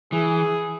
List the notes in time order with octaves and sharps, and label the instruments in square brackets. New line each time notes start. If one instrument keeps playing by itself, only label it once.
[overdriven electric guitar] E3 [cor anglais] G#4